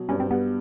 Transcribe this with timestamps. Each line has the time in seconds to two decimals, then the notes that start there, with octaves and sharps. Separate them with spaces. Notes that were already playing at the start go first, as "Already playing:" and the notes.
Already playing: B2 F#3
0.09 G2 C#4
0.20 C4
0.31 G3 B3